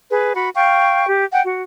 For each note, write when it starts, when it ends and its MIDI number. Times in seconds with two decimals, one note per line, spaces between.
0.10 0.33 68
0.10 0.33 71
0.35 0.48 66
0.35 0.48 83
0.55 1.07 77
0.55 1.07 79
0.55 1.07 85
1.08 1.24 67
1.32 1.42 78
1.32 1.42 79
1.44 1.62 66